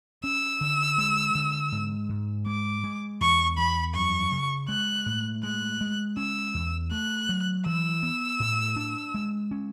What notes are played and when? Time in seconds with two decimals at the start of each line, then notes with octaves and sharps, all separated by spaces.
0.24 C#4 E6
0.61 D3
0.98 G#3
1.35 D3
1.72 G#2
2.09 G#2
2.46 G#3 D6
2.84 G#3
3.21 E2 C#6
3.57 E2 B5
3.94 F#2 C#6
4.32 C#3
4.69 G#3 F#6
5.06 A2
5.43 G#3 F#6
5.81 G#3
6.17 C#4 E6
6.55 E2
6.91 A3 F#6
7.29 F#3
7.66 E3 E6
8.03 B3
8.40 A2
8.76 D4
9.14 G#3
9.51 C#4